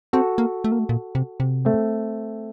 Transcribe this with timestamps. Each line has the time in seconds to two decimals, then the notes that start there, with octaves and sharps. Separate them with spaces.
0.13 C4 F#4 A4
0.38 A#3
0.64 A3
0.72 A#3
0.79 A3
0.89 A#2
1.15 C3
1.40 C3
1.65 A3 C4